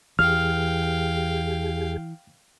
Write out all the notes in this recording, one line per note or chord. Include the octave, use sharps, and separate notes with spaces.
E2 E3 G4 G#4 F5 G5 F6